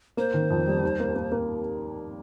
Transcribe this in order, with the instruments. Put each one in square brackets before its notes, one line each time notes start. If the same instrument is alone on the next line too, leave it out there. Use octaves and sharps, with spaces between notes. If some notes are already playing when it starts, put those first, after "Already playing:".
[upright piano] A#3 [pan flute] C5
[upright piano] D#3
F2
G3
D#2
A#3
A#3
A#3